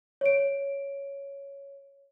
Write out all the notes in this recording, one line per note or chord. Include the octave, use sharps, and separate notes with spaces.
C#5 D7